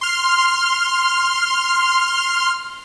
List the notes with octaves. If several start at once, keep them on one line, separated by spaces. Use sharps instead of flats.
C6 F6